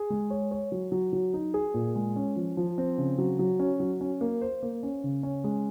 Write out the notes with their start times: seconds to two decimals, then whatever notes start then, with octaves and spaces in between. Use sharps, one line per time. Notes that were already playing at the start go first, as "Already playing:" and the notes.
Already playing: G#4
0.10 G#3
0.30 C#5
0.51 C#5
0.72 F#3
0.92 F#3
1.13 F#3
1.34 D#4
1.54 G#4
1.74 A#2
1.96 G#3
2.16 C#4
2.36 F3
2.57 F3
2.78 C4
2.98 C#3
3.18 F#3
3.39 F#3
3.59 C#4
3.80 F#3
4.01 C#4
4.21 A#3
4.41 C5
4.63 A#3
4.83 C#4
5.04 C#3
5.23 C#4
5.44 G#3